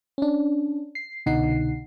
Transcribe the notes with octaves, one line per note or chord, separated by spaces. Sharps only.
C#4 D4
C7
C2 B2 D3 D#4 F#5 C7